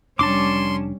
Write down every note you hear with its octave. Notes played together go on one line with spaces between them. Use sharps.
F1 G3 C#4 D4 A5 C6 D6